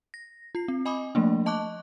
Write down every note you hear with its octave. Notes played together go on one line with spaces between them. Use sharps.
A#6
F4 C7
C4
D#5 G#5 B5 D6 D#6
F3 A3 A#3 D4
D#5 A5 C#6 D6 F#6